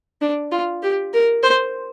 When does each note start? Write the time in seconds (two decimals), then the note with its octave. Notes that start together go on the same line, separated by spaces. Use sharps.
0.21 D4
0.51 F4
0.83 G4
1.13 A#4
1.43 C5